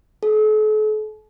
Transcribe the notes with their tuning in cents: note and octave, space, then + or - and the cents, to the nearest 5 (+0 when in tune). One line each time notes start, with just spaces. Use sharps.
A4 -45